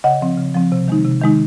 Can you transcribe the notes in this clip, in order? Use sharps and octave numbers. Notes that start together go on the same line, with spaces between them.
C#3 D#5 F#5
F3 C4
C#3
F3 C4
C3
D#3 G#3 D#4
C3
D#3 G#3 D#4